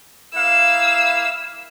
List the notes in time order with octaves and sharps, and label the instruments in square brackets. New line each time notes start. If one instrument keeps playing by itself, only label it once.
[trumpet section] A#3 E4 F5 [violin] E6